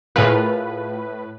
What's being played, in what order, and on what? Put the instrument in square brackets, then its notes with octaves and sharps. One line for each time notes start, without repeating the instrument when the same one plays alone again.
[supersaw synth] A2 B4 [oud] F4 G#4 A#4